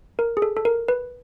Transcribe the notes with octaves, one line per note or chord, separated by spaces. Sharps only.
A#4
G#4
A4
A4
A#4
B4